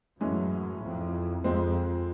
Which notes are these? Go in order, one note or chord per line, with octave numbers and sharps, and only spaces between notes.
F#2 A2 E3 G#3 C#4
F2
F2 F3 G#3 C4